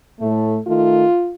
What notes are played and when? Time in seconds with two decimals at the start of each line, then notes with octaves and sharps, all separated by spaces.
0.19 A2 A3
0.67 D#3 A3 F4